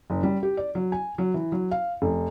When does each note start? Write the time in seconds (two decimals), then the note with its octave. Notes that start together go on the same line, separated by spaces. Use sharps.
0.10 F#1
0.23 G3
0.43 G4
0.57 D5
0.75 F#3
0.92 G#5
1.18 F#3
1.34 E3
1.52 F#3
1.71 F5
2.02 F1